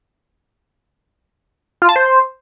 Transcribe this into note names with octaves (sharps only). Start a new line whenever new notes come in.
F4
A5
C5